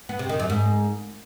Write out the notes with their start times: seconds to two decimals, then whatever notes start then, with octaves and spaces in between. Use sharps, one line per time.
0.09 B3
0.19 C3
0.29 D#3
0.40 F#2
0.50 G#2